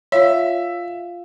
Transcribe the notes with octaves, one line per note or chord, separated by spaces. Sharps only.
F4 C#5 E5 F5